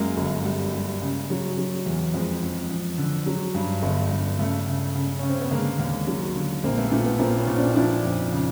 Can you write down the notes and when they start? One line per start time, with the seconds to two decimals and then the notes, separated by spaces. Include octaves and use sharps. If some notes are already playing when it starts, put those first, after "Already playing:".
Already playing: F#2 G#3 A#3
0.17 G1
0.45 G3
0.74 G3
1.02 C#3
1.30 F#3
1.58 F#3
1.86 E2
2.14 F2 G#3
2.42 F2
2.70 F2
2.98 D3
3.26 F#3
3.54 G2
3.82 G1
4.10 G2
4.39 C#3 A3
4.67 C#3
4.95 C#3
5.19 C#3 C#4
5.29 C4
5.40 B3
5.51 D3 G#3 A#3
5.79 D#2
6.07 F#3
6.35 D3
6.63 A#1 A#3 C4
6.78 A3 B3
6.91 A#2 A3
7.05 A3 B3
7.19 A#2 A#3 C4
7.38 B3 C#4
7.47 A#2
7.57 C4 D4
7.69 D#4
7.75 F3 D4 E4
8.04 F2
8.32 C#3